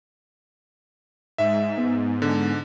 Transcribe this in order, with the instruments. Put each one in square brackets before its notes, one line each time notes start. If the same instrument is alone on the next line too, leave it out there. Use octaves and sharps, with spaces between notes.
[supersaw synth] G#2 [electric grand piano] E5
[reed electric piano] B3
[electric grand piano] D3